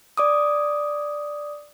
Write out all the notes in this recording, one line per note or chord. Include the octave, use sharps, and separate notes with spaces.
D5 D6 D#6